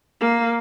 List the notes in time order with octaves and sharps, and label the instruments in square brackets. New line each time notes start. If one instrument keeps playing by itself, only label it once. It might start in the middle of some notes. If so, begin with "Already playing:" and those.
[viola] A#3